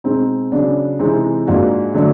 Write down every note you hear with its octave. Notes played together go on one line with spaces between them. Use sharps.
B2 G#3 C4 D#4
C#3 F#3 B3 D4
C3 E3 G#3 C4 D#4
G#2 F3 A#3 D4 F#4
D3 F#3 A3 D4